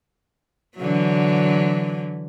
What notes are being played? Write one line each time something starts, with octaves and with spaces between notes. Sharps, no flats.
D3 E3 F#3